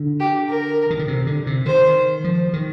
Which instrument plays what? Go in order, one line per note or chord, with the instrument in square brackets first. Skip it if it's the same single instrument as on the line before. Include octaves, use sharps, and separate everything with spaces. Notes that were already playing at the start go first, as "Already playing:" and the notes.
Already playing: [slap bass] D3
[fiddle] G4
A#4
[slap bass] D#3
D3
C3
D3
C3
[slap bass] D#3 [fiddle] C5
[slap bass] F3
D#3